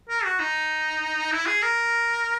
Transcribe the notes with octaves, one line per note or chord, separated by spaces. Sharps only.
A#4
F#4
D#4
E4
G#4
A#4